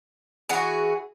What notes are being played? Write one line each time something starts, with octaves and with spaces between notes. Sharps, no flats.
E3 F#4 G#4